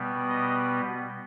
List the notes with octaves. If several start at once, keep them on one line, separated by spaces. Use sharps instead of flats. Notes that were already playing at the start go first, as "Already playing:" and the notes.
Already playing: B2 G3 B3
D#5